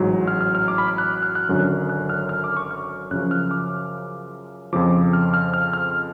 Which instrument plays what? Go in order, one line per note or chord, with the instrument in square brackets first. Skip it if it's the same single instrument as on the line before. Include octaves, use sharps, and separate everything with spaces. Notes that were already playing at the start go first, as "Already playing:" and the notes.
Already playing: [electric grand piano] A1 G#2 F#3
F6
F6
F6
D6
B5
F6
F#6
F6
F#6
G#1 F#2 D3 F#3
F#6
F6
F6
D6
C#6
F6
F#2 C#3 F3 F#6
F6
D6
F2 C#3 F3 D6
F6
F6
F6
F6